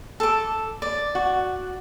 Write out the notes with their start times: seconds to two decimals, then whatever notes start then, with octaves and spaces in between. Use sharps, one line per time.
0.20 A4 D6
0.82 D5
1.15 F#4